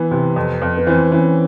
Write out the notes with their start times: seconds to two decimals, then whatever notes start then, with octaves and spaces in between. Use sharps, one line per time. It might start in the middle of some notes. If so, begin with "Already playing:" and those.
Already playing: E3 B3
0.11 C3
0.36 F2
0.62 F2
0.77 B3
0.87 E3 C4
1.11 E3 C#4